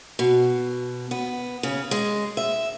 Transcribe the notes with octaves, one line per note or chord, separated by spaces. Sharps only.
B2
B3
C#3
G#3
E5